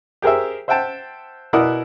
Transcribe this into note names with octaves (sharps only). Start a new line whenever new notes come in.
G4 G#4 A#4 C5 E5
C5 E5 F#5 G5 A5
B2 E4 A#4 D5 F#5 D#6